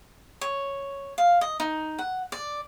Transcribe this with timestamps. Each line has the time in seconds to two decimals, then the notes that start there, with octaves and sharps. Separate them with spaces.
0.41 C#5
1.18 F5
1.41 D#5
1.60 D#4
1.99 F#5
2.32 D5